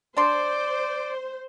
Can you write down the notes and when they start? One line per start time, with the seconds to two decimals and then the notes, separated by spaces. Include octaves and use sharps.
0.17 D4 C5 D5 C6